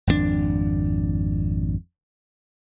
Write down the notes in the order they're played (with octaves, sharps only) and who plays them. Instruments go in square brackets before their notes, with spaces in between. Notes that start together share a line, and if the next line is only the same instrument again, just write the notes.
[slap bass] G#1 F2 B2 D4